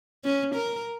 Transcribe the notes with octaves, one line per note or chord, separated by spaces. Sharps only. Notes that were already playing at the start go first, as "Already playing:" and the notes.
C#4
A#4